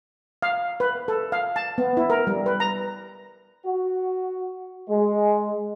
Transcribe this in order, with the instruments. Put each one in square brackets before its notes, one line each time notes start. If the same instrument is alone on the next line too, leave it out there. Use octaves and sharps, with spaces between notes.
[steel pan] F5
B4
A4
F5
A5
B3
E4
A#4
G3
B4
A#5
[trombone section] F#4
G#3